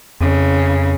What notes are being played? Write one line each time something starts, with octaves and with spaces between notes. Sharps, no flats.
F2 C#3